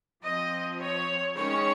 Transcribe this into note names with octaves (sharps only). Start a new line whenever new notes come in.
F3 C4 D#5
C#5
D#3 G#3 C#4 C#5